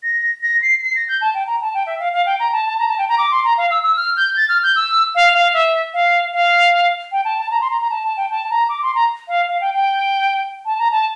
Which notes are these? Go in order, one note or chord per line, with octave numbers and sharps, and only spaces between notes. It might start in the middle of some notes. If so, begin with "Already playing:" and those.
A#6
A#6
C7
C7
A#6
G6
A5
G5
A#5
A5
G5
E5
F5
F5
G5
A#5
A5
A5
A#5
A5
G5
A#5
D6
C6
A#5
F5
E6
E6
F6
G6
A6
F6
G6
E6
F5
F5
E5
F5
F5
G5
A5
A5
A#5
C6
A#5
A#5
A5
A5
G5
A5
A#5
D6
C6
A#5
F5
F5
G5
G5
A5
A#5
A5